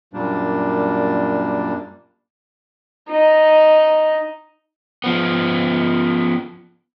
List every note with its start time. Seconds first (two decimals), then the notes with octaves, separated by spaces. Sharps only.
0.13 F#2 A#2 G3 A#3 D4
3.10 D#4
5.04 F3 B3